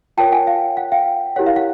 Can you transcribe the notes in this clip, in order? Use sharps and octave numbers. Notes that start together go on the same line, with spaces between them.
F4 A#4 C#5 G5 A5
F#5 G#5
F5
F#5
F5 G5
E4 G4 A#4 C#5 F#5
F5
F#5